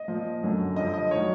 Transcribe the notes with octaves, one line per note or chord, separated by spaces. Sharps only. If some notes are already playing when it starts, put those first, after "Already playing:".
Already playing: D#5
A#2 F3
F#2 D3 F#3
G2 D3 F3 D#5
D#5
D#3 F#3 C#5